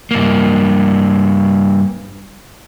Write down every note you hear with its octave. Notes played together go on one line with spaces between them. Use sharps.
G2 A#3